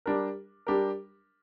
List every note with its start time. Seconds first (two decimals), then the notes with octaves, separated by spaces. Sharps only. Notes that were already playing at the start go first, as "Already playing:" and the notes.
0.06 G3 D4 G4 A#4
0.67 G3 D4 G4 A#4